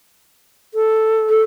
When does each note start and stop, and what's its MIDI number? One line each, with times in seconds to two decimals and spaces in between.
0.74 1.28 69
1.29 1.42 69